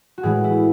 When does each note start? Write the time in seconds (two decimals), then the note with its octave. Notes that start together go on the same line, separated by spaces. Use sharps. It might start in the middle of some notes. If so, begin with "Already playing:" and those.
0.18 F#4
0.23 A2 E3 G#3 G#4
0.44 E4